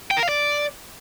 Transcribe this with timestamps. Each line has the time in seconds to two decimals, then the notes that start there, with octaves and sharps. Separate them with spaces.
0.11 G5
0.17 A#4
0.23 F5
0.29 D5